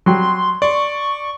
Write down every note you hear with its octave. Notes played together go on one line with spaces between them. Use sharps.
F#3 G3 C6
D5 C6 C#6